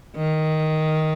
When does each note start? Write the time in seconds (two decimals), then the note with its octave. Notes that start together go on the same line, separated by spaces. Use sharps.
0.16 D#3